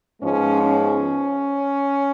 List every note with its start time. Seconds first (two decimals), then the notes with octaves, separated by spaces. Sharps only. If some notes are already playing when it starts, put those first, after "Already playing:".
0.22 G#2 F3 G#3 B3 C#4
0.61 C#4